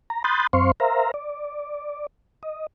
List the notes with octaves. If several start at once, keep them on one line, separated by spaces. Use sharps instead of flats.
A#5
B5 C6 D#6 F#6 G6 A6
F#2 C4 C5 F5 C6 C#6
A#4 C5 E5 F5 A#5
D5
D#5